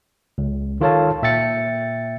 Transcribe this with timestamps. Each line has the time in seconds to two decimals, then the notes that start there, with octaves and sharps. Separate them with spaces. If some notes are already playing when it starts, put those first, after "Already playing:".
0.38 C#2
0.81 D#3 F4 A4 C#5 F5 A5
1.22 A#2 E5 G5 A6 C#7